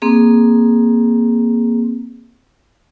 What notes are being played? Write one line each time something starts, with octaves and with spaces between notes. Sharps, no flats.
A#3 C4 G#4